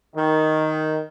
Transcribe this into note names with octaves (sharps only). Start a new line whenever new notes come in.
D#3